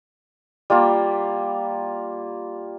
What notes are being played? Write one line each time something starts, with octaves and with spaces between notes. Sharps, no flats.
G3 A#3 F4